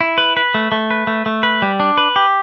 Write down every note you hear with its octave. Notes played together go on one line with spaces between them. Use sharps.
E4
B4
B4
A3
A3
B4
A3
A3
B4
G3
D4
B4
G4